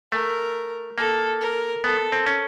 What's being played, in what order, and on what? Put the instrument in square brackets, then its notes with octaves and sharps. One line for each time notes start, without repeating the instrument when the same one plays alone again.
[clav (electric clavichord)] A3 [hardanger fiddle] A#4
[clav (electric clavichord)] A#3 [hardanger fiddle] A4
[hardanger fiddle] A#4
[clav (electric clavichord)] B3 [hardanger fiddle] A4
[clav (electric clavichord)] C4
C#4